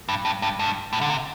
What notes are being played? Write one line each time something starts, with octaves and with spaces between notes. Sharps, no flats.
G2
G2
G2
G2
A2
D3
C3